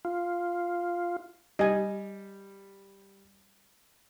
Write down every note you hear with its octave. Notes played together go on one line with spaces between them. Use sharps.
F4
G3 D#5 G#5